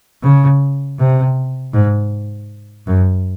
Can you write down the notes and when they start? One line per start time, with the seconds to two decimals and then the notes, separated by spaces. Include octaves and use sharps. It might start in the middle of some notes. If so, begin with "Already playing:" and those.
0.23 C#3
0.99 C3
1.73 G#2
2.87 F#2